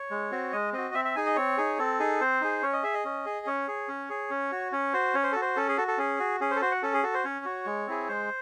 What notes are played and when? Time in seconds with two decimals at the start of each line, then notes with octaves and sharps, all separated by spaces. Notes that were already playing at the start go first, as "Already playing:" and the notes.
Already playing: C#5
0.11 G#3
0.31 C4 F#4
0.53 G#3 D#5
0.73 C4 F#4 D#5
0.94 C4 E5
1.05 E5
1.16 D#4 G#4 G#5
1.26 D#5
1.36 C4 C#5
1.57 D#4 G#4
1.79 C4 A4
2.00 D#4 G#4
2.21 C4 C5
2.41 D#4 G#4
2.62 C#4 C#5
2.73 D#5
2.83 G#4 E5
2.94 D#5
3.05 C#4
3.26 G#4
3.46 C#4 C#5
3.68 G#4
3.88 C#4
4.10 G#4
4.30 C#4
4.52 F#4
4.72 C#4 C#5
4.93 F#4 C5
5.14 C#4 C#5
5.23 C5
5.32 F#4 A4
5.42 C5
5.56 C#4 A4
5.69 G#4
5.77 F#4 A4
5.88 A4
5.98 C#4 G#4
6.19 F#4
6.40 C#4 G#4
6.51 C5
6.56 A4
6.61 F#4 C5
6.72 F#5
6.82 C#4 A4
6.93 G#4
7.03 F#4 A4
7.14 C5
7.24 C#4 C#5
7.45 F#4
7.66 G#3
7.87 C4 E4 G#4
8.08 G#3 C5